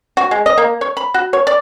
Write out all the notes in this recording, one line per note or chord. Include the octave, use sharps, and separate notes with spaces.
F#4
G#3
D#5
A#3
C#5
B5
F#4
C#5
D5